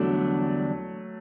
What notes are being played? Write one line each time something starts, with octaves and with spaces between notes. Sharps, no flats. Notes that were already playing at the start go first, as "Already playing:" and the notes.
Already playing: E2 D3 F#3 G3 A3 D4